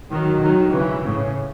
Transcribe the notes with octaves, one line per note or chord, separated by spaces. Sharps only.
D#3 F#3
D#3 F#3
C#3 E3
A2 C#3